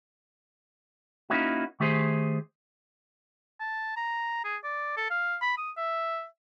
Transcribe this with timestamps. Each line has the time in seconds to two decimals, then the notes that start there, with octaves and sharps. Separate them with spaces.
1.30 A#3 C#4 D#4 E4 F#4
1.80 D#3 A3 G4 G#4 C5
3.60 A5
3.97 A#5
4.44 G#4
4.64 D5
4.97 A4
5.10 F5
5.42 B5
5.57 D#6
5.77 E5